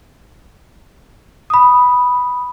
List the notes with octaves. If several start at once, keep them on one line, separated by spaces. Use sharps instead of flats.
B5 D#6